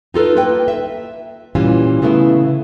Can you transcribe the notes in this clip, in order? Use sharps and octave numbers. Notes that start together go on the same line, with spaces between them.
D#4 F4 A4 B4
A#3 B4 G5
E5
A#2 E3 G3 C#4 F4
C#3 A3 B3 E4